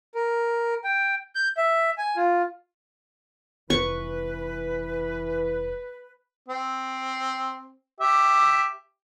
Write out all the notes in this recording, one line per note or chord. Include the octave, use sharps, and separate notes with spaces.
A#4
G5
G6
E5
G#5
F4
F1 E3 B4 C#6
C4
G4 E5